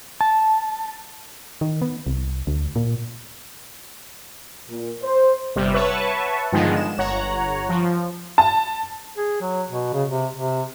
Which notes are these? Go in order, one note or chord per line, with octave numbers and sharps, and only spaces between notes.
A5
D#3
B3
C2
D2
A#2
A#2
C5
G1 C3 G3
B4 C#5 E5 F#5 A5 C#6
G2 D3 D#3 F3 G#3 B3
E7
G1 C#5 F#5 A#5
F3
A5
G#4
F#3
B2
C#3
C3
C3